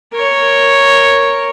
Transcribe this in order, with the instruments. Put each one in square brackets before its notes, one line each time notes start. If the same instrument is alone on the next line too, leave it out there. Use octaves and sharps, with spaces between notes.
[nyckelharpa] A#4 C#5